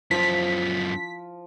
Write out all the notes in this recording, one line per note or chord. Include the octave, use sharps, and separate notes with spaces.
F#2 F3 F4 B6